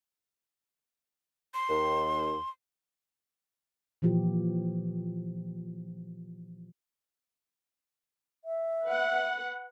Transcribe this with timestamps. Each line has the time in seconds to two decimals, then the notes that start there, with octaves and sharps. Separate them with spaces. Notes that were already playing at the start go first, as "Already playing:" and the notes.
1.54 C6
1.69 D#2
4.02 A#2 E3 F3 G4
8.45 E5
8.84 B4 F#5